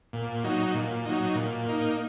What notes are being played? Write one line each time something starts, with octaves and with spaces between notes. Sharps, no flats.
A#2
F#3 D#4
A#2
F#3 D#4
A#2
A#3 D#4